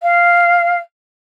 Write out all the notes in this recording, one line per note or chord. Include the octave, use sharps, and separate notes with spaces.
F5